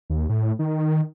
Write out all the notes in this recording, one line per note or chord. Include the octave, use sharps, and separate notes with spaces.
D#2
A2
D#3